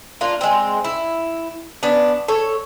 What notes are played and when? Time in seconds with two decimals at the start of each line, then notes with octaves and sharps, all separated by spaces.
0.21 A#3 D4 F4
0.41 G#3 C4
0.84 E4
1.83 B3 C#4 D4
2.28 A4 C#5